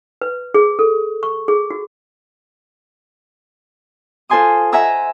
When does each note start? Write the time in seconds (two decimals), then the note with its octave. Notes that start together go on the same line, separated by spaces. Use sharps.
0.21 B4
0.54 G#4
0.79 A4
1.23 C#6
1.48 G#4
1.70 F#4
4.29 F4 A4 C5 G#5 C6 D#6
4.72 E5 F#5 G#5 A#5 E6